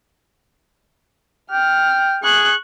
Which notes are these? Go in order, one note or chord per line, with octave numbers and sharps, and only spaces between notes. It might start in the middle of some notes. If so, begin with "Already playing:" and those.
G5 F6
G#4 C#6 F#6